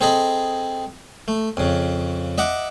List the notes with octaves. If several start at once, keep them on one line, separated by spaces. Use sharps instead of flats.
C4 G#4 A4 D#5 B5
A3
F2 C#3
D#5 E5 F#5 D6